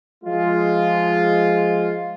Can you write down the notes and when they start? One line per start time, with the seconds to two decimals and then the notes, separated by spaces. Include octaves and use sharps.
0.24 F3 G#3 F4